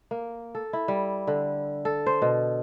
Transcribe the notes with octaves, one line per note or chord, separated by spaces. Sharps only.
A#3
A4
E4
G3
D3
A4
C5
B2